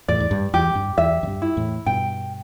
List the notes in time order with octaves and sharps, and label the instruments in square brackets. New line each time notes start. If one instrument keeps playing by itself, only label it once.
[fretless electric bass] E2 A2 [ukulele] D5
[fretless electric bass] E2
G2
[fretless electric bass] E2 [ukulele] G4
[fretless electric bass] G2
[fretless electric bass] E2 [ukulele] E5
[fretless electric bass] E2
G2
[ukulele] E4
[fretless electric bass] E2 A2
[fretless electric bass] G2 B2 [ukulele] G5